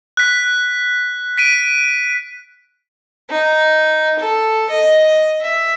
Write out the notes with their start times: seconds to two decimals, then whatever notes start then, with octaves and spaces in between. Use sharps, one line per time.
0.17 F#6 B6
1.38 B6 D7 D#7
3.31 D#4
4.18 A4
4.69 D#5
5.40 E5